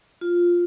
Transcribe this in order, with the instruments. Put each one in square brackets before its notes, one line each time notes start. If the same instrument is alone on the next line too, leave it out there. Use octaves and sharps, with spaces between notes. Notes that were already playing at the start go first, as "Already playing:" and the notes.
[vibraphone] F4